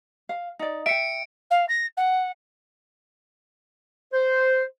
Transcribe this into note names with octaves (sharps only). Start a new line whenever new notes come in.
F5
D#4 D5
E5 G5 C#7 D7
F5
A#6
F#5
C5